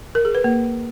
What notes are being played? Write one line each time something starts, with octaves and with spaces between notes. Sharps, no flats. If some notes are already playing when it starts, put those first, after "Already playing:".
A#4
G#4
B4
A#3